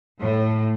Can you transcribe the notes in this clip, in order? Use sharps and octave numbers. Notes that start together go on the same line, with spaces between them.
A2